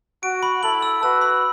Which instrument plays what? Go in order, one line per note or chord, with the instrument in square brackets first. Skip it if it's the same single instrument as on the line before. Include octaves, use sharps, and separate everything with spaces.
[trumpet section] F#4 [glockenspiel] D7
[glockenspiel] B5
[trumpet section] E4 A4 [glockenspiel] F#7
[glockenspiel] E6
[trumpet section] F#4 B4 [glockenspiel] E6
[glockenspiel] B5